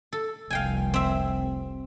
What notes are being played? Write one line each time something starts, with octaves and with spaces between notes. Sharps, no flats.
A4
F1 C2 F5 G5 G#5
C4 E5